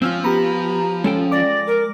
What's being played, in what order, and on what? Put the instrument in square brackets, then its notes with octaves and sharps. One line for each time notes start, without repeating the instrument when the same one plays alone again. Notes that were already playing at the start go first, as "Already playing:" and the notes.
[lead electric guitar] F3 [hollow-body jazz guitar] C4 C#4 F4 [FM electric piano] E6 F6
[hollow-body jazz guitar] B3 [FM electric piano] G4 A#5 B5
[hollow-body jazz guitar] G#3 A4 G5 [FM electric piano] C#4
[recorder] D5 [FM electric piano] D6 A#6
[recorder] A#4